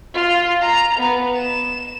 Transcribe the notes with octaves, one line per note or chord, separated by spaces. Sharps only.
F4
A#5
B3
E7